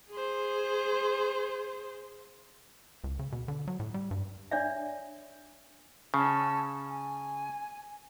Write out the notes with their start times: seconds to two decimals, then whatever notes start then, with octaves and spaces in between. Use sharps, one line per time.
0.10 G#4 C5
3.04 C#2
3.19 C#3
3.32 B2
3.48 D3
3.68 F#3
3.80 A2
3.94 G3
4.11 G2
4.51 D4 C#5 D5 E5
6.14 C#3 C#4 A5 E6
6.89 G#5